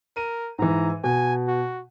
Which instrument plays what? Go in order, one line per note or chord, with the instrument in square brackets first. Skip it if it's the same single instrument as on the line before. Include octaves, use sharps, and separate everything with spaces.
[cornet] A#4 [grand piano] D#7
[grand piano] G#2 E3 [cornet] A#5
[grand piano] B2 [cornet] G#5
[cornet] F#4